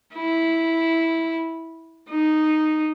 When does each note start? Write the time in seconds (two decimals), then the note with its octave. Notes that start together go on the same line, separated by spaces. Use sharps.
0.14 E4
2.10 D#4